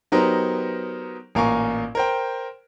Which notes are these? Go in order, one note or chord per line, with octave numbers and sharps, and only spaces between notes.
F#3 B3 D#4 G4 A#4 C5
A1 A#2 A#4 F5 G#5 C#6
A#4 C5 G5